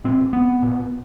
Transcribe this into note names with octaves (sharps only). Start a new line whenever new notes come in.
A#2 C4
B3
A#2